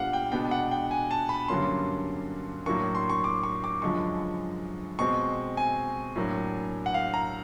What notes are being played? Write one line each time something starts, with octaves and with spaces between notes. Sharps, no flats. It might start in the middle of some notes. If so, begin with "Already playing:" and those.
Already playing: A#2 G3 B3 D4 F5 F#5
G5
B2 G#3 B3 D4 G5
F#5
G5
G#5
A5
B5
G2 D3 F#3 A#3 C#4 C6
A2 F#3 A#3 D4 C#6
C6
C#6
D6
C#6
D6
F#2 D3 F3 G#3 C#6
B2 G#3 C4 C#6
G#5
A2 F#3 A#3 D4
F#5
F5
A#5